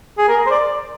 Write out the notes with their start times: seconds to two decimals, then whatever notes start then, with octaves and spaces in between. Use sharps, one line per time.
0.18 G#4
0.29 A#4
0.46 C5
0.51 D5